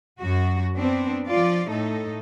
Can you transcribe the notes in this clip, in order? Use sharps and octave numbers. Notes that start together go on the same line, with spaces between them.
F#2 F#4
B3 C4 D4
F3 F4 D5
A2 D#4 A4